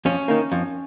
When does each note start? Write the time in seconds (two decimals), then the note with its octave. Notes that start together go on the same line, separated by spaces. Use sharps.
0.05 F2 C#4
0.28 D#3 A#3
0.52 F2